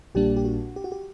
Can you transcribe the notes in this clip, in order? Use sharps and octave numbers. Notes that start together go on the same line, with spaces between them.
A#1 A#2 G3 A#3 D4 G4
G4
F#4
G4
F#4
G4